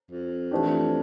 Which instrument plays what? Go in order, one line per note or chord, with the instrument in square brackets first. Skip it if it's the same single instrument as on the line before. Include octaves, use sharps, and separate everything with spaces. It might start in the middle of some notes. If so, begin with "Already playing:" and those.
[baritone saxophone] F2
[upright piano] E3 A3 D4 G4